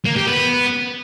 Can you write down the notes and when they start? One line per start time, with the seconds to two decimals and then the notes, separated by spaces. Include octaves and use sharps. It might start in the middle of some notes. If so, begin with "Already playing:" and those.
0.05 A#3
0.16 G4
0.27 B3